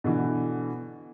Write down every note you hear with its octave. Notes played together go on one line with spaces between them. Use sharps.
B2 D3 E3